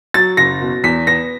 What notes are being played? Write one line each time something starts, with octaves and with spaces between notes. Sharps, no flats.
F#3 A6
F#1 A#6
B2
E2 B6
B3 A#6